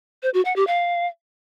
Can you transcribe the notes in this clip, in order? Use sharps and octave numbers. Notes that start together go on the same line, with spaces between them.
C5
F#4
F#5
G4
F5